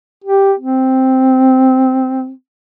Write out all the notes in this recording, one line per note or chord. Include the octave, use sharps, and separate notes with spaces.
G4
C4